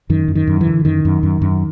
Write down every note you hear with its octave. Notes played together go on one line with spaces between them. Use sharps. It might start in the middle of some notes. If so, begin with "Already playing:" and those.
F#2 D#3
F#2
D#3
F#2
E3
D3
F#2 D#3
F#2
F#2
F#2